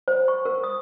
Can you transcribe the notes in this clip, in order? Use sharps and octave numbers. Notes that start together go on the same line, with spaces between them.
C5
C#6
A#4
D#6